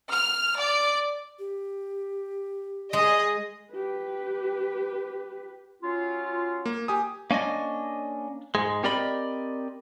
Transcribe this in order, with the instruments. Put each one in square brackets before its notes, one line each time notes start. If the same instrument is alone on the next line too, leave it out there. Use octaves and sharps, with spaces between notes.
[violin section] F6
D5
[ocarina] G4
[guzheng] G#3 [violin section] G#4 D#5
[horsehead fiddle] G4 B4
[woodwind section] F#3 C#4 F4
[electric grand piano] A#3
G4 G#5 D#6
[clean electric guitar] A#3 C#4 D4 D#5
G#2 G#3
C4 G4 A#4 D5 D#5 B5